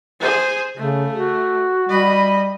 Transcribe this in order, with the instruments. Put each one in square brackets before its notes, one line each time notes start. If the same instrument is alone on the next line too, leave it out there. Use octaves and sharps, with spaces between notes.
[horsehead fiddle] G#4 C5
[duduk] C#3 [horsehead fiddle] A3
[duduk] F#4
[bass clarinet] G3 [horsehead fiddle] D#5 B5